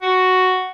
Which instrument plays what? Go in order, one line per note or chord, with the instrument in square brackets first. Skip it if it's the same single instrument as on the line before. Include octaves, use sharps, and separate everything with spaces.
[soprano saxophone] F#4